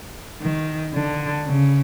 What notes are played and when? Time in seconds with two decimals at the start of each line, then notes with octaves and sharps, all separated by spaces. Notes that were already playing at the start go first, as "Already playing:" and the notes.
0.41 D#3
0.94 D3
1.46 C#3